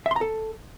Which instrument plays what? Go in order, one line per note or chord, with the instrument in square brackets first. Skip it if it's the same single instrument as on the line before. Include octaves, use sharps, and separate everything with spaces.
[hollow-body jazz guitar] E5
C6
A#5
A4